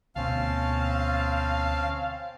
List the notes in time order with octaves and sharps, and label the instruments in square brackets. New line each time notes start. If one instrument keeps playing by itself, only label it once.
[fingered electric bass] D2 B2 [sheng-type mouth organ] C4 C#4 A5 [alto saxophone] F5